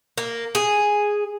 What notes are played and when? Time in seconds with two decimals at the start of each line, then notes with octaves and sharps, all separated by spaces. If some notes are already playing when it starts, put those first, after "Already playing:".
0.18 A#3
0.55 G#4